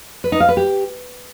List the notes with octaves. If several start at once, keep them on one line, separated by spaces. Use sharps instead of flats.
B4
D#4
F5
B4
G4